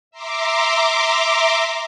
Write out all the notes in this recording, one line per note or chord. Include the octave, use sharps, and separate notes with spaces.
E5 A#5 C6 D6